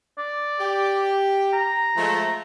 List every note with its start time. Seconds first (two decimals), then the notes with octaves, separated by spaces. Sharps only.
0.18 D5
0.60 G4
1.53 A#5
1.97 F3 G#3 A3